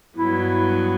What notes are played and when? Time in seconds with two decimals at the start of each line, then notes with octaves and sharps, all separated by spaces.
0.17 G2 F#3 B3 E4